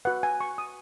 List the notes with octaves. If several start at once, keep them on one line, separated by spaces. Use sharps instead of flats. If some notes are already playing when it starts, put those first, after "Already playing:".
F#4 B4 F#5
G#5
C#6
D#6